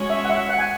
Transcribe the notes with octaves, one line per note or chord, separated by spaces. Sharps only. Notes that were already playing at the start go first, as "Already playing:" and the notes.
Already playing: G#3 C#4 F#4 C#5
E5
F#5
E5
F#5
G#5